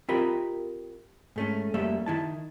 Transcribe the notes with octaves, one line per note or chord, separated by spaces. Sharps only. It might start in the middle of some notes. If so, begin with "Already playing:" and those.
C4 F4 G4 A#4 D#5 B5
G#2 A3 C#4
F#2 G3 A3 A#3 E5
D#3 E4 A5